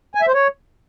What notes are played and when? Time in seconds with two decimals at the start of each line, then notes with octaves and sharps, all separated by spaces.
0.15 G#5
0.21 E5
0.28 C5
0.34 C#5